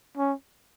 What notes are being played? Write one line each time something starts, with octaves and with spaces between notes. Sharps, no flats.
C#4